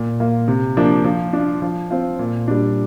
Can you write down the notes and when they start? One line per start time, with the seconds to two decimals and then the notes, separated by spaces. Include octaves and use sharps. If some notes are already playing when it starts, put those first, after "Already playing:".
Already playing: A#2
0.20 A#3 F4
0.48 C3
0.77 F3 A#3 D4
1.05 F3
1.33 D4 F4
1.62 F3
1.90 C4 F4
2.19 A#2
2.48 G3 D4